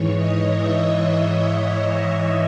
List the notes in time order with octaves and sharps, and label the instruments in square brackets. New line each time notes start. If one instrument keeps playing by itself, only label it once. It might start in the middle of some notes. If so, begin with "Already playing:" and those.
Already playing: [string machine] G#2 E3 C#5
D#5
E5